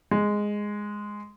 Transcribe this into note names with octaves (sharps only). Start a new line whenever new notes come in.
G#3